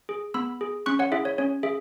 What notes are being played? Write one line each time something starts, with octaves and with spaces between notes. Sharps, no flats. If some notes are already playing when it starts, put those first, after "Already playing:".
G#4
B3 B5 E6
G#4
C#4 C#6 F#6
C#5 F#5
E4 G#4 E5
C#5
C#4 C#5
G#4 E5